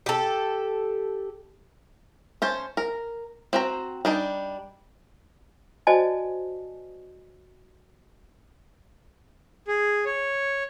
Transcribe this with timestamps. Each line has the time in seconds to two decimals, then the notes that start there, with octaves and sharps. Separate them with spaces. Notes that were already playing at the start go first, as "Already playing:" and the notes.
0.06 G4 A4
2.42 C#4 C5 A5
2.77 A#4
3.53 C4 F#4 A#5
4.05 G3 D4 D#4
5.87 F#4 C5 D5 D#5 G#5 A5
9.68 G#4
10.05 C#5